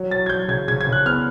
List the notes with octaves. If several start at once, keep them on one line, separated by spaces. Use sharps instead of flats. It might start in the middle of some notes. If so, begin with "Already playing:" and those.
Already playing: F#3
F#3 A6
G#6
F#3 G6
C#3 G#6
C#3 G#6
G#6
C#3
F#6
B3 F6